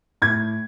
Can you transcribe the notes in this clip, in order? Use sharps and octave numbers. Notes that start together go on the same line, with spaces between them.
A2 G#6